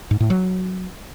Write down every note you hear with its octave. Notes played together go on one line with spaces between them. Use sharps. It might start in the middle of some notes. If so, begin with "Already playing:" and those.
G#2
A2
F#3